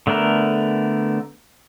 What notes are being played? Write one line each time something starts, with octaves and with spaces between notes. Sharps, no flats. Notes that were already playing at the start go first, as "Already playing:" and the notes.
D3 A3 B3 A#4